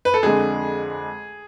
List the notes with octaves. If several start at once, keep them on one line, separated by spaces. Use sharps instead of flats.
B4
A4
F2 D3 G#3 G#4